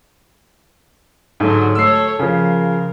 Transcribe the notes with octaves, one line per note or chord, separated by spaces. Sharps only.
G#2 D3 F#3
A3 A4 C#5 E6 C7
C#3 F3 A#4